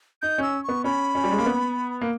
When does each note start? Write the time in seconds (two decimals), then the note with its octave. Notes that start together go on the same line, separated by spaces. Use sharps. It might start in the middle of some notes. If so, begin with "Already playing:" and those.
0.22 D#4 G6
0.38 C#4 E6
0.64 B3 C#6
0.84 C#4 B5
1.15 C#4
1.24 G3
1.32 G#3
1.38 A#3
1.46 B3
2.01 A#3